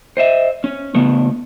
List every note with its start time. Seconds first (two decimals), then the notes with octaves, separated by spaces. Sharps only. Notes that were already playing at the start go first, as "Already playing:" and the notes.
0.17 C5 D#5 E5
0.64 C#4
0.95 C#3 A3 B3